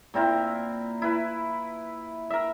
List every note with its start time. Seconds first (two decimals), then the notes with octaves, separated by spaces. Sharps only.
0.14 A#2 C4 E4 A#4
1.02 E4 B4
2.30 A#4 E5